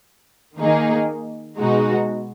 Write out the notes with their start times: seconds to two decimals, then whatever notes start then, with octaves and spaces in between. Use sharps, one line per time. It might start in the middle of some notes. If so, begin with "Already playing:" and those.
0.59 D#3 A#3 D#4 G#4
1.58 B2 G#3 D#4 F#4